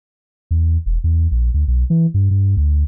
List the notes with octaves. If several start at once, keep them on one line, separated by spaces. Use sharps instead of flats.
E2
E1
E2
A#1
D2
B1
E3
G2
G2
D2